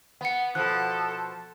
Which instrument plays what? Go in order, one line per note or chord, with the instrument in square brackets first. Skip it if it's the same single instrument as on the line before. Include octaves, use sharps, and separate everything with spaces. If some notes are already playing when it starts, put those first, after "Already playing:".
[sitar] B3 [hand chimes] F#5 C#7
[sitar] B2 F3 [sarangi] A4 [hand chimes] F#6